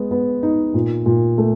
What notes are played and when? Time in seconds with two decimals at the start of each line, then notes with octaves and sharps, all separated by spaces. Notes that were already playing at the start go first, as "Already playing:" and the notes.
Already playing: G#3 B3
0.11 B3
0.43 D#4
0.74 A#2
1.06 A#2
1.38 A3